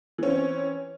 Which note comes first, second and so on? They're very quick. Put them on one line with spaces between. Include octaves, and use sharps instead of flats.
E3 C#4 C4